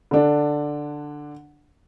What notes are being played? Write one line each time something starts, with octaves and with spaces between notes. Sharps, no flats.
D3 D4